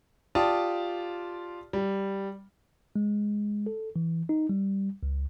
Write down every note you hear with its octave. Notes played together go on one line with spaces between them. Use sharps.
F4 G4 D5 A5 D#6
G3
G#3
A4
E3
D#4
G3
C#2